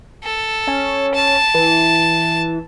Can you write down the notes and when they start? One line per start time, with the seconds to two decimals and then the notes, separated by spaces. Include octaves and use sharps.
0.24 A4
0.67 C#4
1.15 A5
1.54 E3